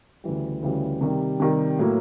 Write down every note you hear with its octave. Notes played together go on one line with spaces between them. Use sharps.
D2 C#3 E3 G3
D2 C#3 E3 G3
C3 D#3 G3
C3 D#3 G3
A2 F#3 A#3